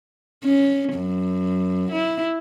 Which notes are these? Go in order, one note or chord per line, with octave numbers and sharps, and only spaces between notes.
C#4
F#2
E4